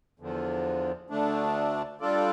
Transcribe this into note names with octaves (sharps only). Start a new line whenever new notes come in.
E2 D3 F3
D2 D3 A3 D4
G3 D4 F4 A4 D5